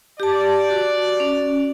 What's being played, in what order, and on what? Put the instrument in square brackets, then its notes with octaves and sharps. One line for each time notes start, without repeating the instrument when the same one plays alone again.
[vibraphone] G4 A5 [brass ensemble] D5
[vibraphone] F#4
C#4